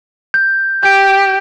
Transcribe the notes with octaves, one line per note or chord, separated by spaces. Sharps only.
G6
G4 G6 D7